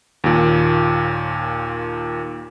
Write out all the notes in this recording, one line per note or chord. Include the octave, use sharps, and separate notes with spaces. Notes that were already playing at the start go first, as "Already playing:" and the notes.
D#2 A#2